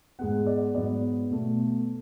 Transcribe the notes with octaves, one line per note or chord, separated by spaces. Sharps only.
G#2 G#3 B3 F#5
D5
G#2 F#3 B3 D5
B2 A3